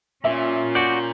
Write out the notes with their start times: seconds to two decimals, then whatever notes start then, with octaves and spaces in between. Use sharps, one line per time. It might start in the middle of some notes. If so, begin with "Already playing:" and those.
0.24 A#2 C#4 F4 E5
0.75 F#4 D5 G6